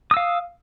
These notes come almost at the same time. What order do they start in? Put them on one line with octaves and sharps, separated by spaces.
D#6 E6 F5